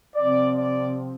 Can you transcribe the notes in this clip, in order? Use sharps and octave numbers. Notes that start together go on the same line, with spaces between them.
C3 F3 C4 D5
D5